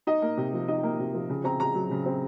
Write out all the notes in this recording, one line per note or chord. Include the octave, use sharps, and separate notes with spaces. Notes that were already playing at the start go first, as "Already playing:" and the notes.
D#4 D#5
A#3
C3
F3
D#4 D#5
A#3
C3
F3
C#3
C4 A#5
C#3 A#5
F#3
C#3
C4